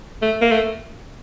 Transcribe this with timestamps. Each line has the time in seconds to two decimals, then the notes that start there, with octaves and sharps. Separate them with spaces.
0.22 A3
0.42 A#3
0.52 A3